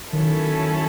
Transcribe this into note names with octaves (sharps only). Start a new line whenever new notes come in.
D#3 F#3 C#4 E4 A4